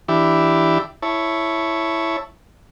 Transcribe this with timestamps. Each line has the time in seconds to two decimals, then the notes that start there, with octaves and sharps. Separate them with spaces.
0.08 E3 D4 E4 G4
1.02 E4 C#5 A5